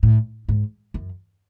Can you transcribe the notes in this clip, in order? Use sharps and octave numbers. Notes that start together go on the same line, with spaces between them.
A2
G#2
F#2